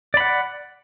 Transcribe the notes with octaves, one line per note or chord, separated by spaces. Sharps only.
D5 F#5 B5